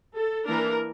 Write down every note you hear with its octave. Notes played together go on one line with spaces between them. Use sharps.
A4
E3 A#3 D4 A#4